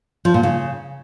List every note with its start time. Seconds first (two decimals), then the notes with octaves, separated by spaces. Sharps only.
0.25 F3
0.34 A#2
0.43 C#3